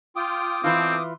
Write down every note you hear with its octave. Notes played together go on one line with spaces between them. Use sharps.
F4 G5 D6 D#6
E3 B3 C4 D#4 F4 A4